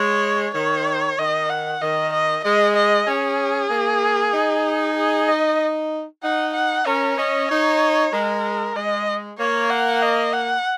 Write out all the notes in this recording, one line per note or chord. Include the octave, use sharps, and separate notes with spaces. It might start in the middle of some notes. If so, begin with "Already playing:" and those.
Already playing: G#3 C#5
D#3 C#5
D#3 D#5
F#5
D#3 D#5
D#5
G#3 D#5
D#5
C#4 G#4
A#3
D#4
G#4
D#5
D#4 F#5
F#5
C#4 A#4
C#4 D#5
D#4 C#5
G#3 A#4
G#3 D#5
A#3 C#5
F#5
D#5
F#5